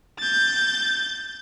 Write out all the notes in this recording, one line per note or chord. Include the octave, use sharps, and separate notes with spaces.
G6 A6